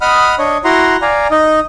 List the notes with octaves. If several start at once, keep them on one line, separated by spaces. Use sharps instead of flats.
D#5 F#5 B5 D#6 F6
D4 C#5 D#5
E4 F#4 F#5 A#5 C6
D5 F5 G#5 A#5
D#4 D#5